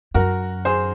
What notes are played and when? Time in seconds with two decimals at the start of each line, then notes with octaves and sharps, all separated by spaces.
0.14 F#2 F#4 A#4
0.65 G#4 C5